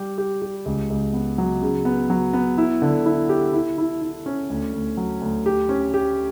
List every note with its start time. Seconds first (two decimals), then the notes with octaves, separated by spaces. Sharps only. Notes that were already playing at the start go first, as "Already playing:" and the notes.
Already playing: G3 G4
0.18 G4
0.42 G4
0.66 C#2
0.90 C#2
1.13 B3
1.38 F#3
1.62 C#3
1.85 B3
2.10 F#3
2.33 B3
2.58 E4
2.82 D3
3.06 E4
3.29 G4
3.53 E4
3.78 E4
4.02 E4
4.26 C#4
4.50 D2
4.73 D2
4.97 F#3
5.21 D2
5.46 G4
5.69 C#4
5.94 G4